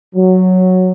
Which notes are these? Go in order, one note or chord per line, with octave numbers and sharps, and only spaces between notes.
F#3